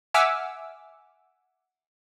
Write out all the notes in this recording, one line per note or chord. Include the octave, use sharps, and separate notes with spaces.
E5 F#5 G#5 D6 E6 F6